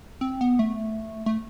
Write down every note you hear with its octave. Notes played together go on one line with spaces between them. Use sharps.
C4
B3
A3
A3